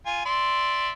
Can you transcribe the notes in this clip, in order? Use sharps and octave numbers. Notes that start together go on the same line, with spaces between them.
F4 G#5
D5 E5 C6